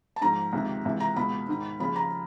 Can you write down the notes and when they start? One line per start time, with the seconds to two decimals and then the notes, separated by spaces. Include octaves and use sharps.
0.16 A5
0.21 G#2 F3 A#5
0.53 C#2 C3 D#3
0.85 C#2 C3 E3
1.00 A#5
1.16 C#2 B2 B5
1.48 G#2 D#3
1.80 D#2 C#3 F3 B5
1.96 A#5